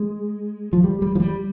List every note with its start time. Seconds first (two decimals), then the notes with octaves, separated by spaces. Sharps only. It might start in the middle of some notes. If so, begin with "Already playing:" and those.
Already playing: G#3
0.73 F3
0.84 G3
1.02 G3
1.15 F3
1.20 G3